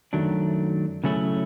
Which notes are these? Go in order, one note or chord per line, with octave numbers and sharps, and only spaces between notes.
F#2 D#3 F#3 A3 D4
C#3 F#3 A3 C#4 E4